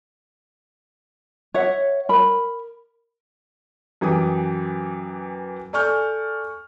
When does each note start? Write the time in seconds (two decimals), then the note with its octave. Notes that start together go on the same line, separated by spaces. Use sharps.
1.54 C#5 E5 F#5
2.09 A#4 B5
4.01 F#2 E3 G4 D#6
5.73 A4 D5 G#5 C#6 F6 G6